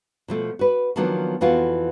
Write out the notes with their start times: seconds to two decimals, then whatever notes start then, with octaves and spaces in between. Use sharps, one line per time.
0.28 B2 F3 A3
0.59 F#4 B4
0.96 D#3 F3 F#3 A#3 B3 D4
1.41 F2 E3 B3 F4 F#4